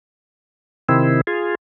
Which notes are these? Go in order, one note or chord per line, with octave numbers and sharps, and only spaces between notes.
C3 D#3 C4 E4
F4 G#4